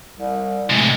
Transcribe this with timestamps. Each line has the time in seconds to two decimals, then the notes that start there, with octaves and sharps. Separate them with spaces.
0.17 C2
0.70 A2 C3 G#3